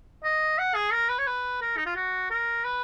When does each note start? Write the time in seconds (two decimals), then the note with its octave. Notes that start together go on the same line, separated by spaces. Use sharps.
0.24 D#5
0.59 F#5
0.75 G#4
0.92 A#4
1.09 B4
1.19 C#5
1.27 B4
1.61 A#4
1.77 D#4
1.86 F4
1.96 F#4
2.31 A#4
2.65 B4